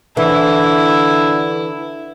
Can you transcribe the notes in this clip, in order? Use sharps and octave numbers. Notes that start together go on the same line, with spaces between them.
D3 E3 E4